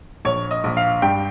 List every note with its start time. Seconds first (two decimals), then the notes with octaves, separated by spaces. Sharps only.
0.25 A#1 C#5
0.51 D#5
0.64 A#1
0.77 F5
1.02 G2 G5